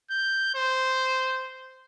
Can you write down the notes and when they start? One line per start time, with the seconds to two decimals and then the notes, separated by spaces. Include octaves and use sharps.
0.11 G6
0.55 C5